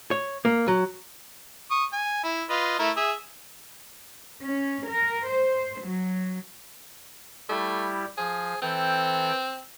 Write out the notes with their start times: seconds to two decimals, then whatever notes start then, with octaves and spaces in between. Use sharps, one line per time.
0.11 C#5
0.45 A#3
0.68 F#3
1.71 C#6 D#6
1.93 G#5
2.24 E4
2.50 F4 B4 D#5
2.79 A3 E4 A#4
2.97 G#4 E5
4.42 C#4
4.86 A#4
5.27 C5
5.80 F#3
7.49 G3 A3 E4 G4
8.18 F3 G#4
8.62 E3 C4 A4 G5